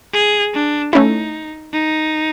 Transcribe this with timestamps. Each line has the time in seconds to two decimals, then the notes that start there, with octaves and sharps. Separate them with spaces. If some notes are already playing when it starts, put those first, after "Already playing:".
0.13 G#4
0.54 D4
0.93 A3 C#4 D#4 E4
1.73 D#4